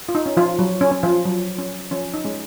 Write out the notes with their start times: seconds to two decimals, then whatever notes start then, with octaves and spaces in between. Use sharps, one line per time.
0.09 F4
0.15 D#4
0.26 C#4
0.37 F3 F4
0.59 F#3
0.81 C#4
0.92 C#4
1.03 F3 F4
1.25 F#3
1.58 C#4
1.91 F3 C#4
2.14 D#4
2.24 G#3 C#4